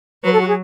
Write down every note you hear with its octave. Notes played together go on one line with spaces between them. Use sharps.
F#3 B4
A4
F#4
G#4